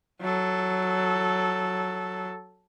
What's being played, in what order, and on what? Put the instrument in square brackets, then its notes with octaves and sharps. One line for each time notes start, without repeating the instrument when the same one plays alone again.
[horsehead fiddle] F#3 A4